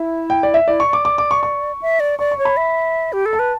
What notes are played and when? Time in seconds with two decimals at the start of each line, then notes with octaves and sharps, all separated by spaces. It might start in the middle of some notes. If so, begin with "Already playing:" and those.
Already playing: E4 E5
0.30 G5
0.43 D5
0.54 E5
0.67 E4 D5
0.80 C#6
0.86 D5
0.93 D6
1.05 D6
1.18 D6
1.31 C#6
1.43 C#6
1.82 E5
2.00 D5
2.19 D5 C#6
2.31 C#6
2.38 C#5
2.45 B5
2.57 E5
3.13 G4
3.26 A4
3.33 A5
3.39 B4